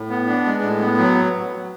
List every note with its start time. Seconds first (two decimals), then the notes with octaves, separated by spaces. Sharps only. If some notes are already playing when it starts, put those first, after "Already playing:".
Already playing: A2
0.10 B3
0.27 D4
0.45 G#3
0.62 A2
0.80 B3
0.98 F#3